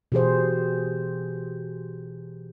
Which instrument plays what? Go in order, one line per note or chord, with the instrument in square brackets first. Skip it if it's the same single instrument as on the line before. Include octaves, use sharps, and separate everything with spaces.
[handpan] B2 E3 G4 G#4 C5